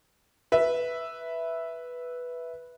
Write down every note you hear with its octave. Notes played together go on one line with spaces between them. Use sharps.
B4 E5